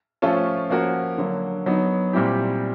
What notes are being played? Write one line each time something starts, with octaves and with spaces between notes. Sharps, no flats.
F3 A3 C#4 F4 A4
F3 A#3 C#4 F#4 A#4
D3 F#3 A#3
F#3 B3 D#4
A#2 G3 C4 E4 G4